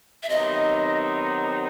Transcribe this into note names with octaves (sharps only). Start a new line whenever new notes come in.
E5
C3 D#3 F#3 B3 D#4 D#5